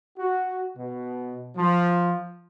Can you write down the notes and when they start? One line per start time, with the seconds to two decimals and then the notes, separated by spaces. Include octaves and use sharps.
0.17 F#4
0.77 B2
1.56 F3